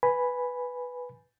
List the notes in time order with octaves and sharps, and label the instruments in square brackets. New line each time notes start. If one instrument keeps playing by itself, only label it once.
[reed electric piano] B4 G#5 B5